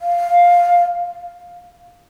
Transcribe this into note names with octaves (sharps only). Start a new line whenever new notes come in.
F5